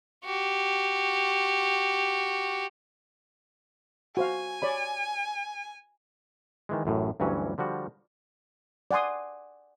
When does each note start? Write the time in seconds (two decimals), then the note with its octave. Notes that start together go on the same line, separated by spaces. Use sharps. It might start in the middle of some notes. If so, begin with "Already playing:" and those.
0.24 F#4 G4
4.17 F#4 C5 F5 G#5
4.62 C#5 D5 B5
6.69 D#3 E3 G#3
6.85 A1 F#2 A2
7.20 D2 G2 E3 F#3 C#4
7.58 D3 F3 G3 F#4
8.91 D5 F#5 G#5 C6 D#6